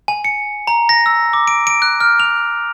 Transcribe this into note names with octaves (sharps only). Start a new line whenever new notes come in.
G#5
C#7
A#5
A#6
E6
D6
D7
D7
F#6
F6
F7